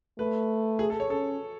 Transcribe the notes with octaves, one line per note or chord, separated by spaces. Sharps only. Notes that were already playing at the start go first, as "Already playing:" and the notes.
A3 B4
G#4
A4
C#5
C#4 A4